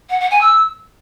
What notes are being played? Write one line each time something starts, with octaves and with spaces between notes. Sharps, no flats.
F#5
F#5
G#5
E6